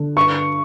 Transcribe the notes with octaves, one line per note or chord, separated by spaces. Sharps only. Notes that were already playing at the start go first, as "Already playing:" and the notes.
Already playing: D3
G2 C#6